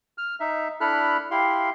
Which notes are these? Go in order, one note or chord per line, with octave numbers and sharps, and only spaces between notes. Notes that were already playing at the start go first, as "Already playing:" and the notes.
F6
D#4 E5
D4 E4 A4 B5 F6 F#6
E4 G4 F5 C6